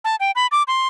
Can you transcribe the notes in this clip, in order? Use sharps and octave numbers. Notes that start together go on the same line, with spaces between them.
A5
G5
B5
D6
C6